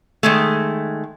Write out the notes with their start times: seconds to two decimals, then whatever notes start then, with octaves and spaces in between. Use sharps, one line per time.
0.23 D#3 G#3 A3